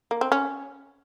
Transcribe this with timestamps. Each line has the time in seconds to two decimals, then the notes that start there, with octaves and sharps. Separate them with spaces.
0.11 A#3
0.21 C4
0.32 C#4